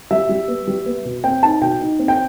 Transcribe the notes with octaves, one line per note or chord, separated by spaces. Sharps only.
G3 E5
G3
B3
G3
B3
B2
C4 G5
D#4 A5
B2 G5
D#4
C4
G5